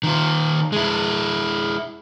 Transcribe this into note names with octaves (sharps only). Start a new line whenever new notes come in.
D#3 F4
G#3 E4